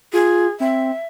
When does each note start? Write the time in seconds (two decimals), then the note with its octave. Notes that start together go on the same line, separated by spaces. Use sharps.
0.13 F4 G#4
0.60 C4 E5